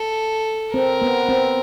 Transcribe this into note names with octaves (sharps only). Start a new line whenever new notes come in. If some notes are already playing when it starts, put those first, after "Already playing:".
Already playing: A4
C4 A#4
B3
C4